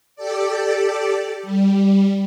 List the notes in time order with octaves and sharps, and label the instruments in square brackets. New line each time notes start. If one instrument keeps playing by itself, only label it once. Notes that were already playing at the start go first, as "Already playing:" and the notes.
[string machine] G4 A4 D5
G3